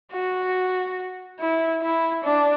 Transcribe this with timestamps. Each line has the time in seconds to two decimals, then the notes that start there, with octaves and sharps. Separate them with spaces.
0.12 F#4
1.40 E4
1.82 E4
2.24 D4